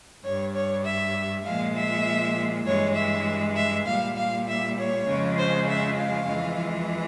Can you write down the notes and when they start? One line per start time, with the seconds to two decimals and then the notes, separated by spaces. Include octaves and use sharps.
0.24 G2 G3 C#5
0.55 C#5
0.85 E5
1.45 A#2 F3 G#3 F5
1.76 E5
2.66 G2 E3 G#3 C#5
2.96 E5
3.56 E5
3.87 A#2 G3 F5
4.17 F5
4.48 E5
4.78 C#5
5.08 F2 C#3 F3 G#3
5.38 C5
5.69 E5
5.98 F5
6.28 F2 E3 G#3